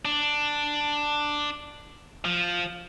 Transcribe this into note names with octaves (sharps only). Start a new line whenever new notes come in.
D4
F3